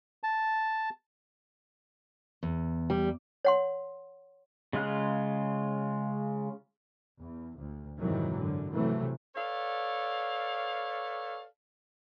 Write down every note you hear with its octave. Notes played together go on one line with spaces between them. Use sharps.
A5
E2
G3
C#5 F#5 C6
C#3 G#3 F4 F#6
E2
D2
F2 G#2 C3 D#3 E3 F#3
F#2 D3
C3 E3 F#3 A3
A4 B4 C#5 D5 F5